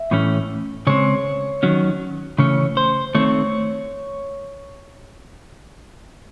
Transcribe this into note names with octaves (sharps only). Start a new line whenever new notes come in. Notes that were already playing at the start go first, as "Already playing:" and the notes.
Already playing: E5
A2 E3 A3 C#4
C#3 G#3 C4 C#5
D#3 F#3 C#4
C#3 E3 A3 C#4 C#5
C5
D#3 A3 C4 C#5